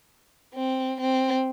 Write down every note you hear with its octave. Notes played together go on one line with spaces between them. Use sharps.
C4
C4